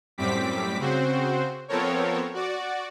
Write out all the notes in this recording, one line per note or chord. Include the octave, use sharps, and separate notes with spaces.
F#2 A2 G3 C4 D6 B6
C#3 C4 F#4 C5
F3 B3 C4 A4 A#4 C#5
F#4 D5